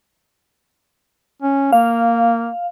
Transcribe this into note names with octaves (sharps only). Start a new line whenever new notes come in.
C#4
A#3 F5